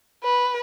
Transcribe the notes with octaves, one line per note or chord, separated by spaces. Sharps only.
B4